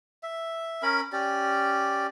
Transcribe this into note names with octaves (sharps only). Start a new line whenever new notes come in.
E5
C#4 A#4 B5
C#4 G4 D5